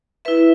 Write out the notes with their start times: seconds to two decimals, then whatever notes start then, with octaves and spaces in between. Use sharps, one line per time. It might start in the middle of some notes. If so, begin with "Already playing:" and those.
0.25 E4 B4 E5